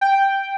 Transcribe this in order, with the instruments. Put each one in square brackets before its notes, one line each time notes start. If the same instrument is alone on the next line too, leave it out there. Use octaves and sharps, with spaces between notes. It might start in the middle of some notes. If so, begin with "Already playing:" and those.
[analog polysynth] G5